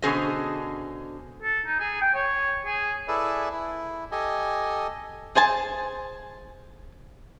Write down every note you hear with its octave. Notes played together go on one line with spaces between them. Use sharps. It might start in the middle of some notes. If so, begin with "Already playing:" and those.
B2 D3 C#4 G#4 C5 D#5
A4
D#4
G#4
G5
C#5
G#4
E4 G#4 A4 B4 D5 E5
E4
G4 A4 D#5 G#5
G#4 C5 G#5 A5